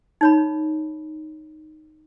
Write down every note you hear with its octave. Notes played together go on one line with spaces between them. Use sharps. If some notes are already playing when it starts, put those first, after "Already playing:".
D#4 C#5 B5